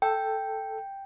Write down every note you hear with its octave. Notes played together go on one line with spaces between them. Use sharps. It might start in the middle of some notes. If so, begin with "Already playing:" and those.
A4 G5